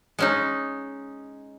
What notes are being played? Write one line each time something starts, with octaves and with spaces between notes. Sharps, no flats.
G#3 C#4 D#4